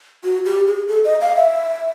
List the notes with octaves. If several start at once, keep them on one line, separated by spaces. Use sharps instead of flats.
F#4
G4
G#4
A4
D#5
F5
E5